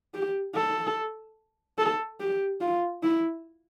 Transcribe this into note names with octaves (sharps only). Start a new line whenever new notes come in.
G4
A4
A4
G4
F4
E4